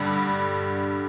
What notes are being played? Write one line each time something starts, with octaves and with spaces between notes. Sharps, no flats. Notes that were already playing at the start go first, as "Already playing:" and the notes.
Already playing: G2 D3 G3